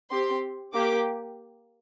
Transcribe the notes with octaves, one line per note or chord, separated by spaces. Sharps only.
C4 G4 C6
A#3 G4 D6